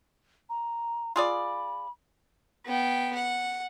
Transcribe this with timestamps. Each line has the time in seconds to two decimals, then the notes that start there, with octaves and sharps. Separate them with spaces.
0.49 A#5
1.16 F4 G#4 D5 B5
2.66 B3 G5
3.16 F#5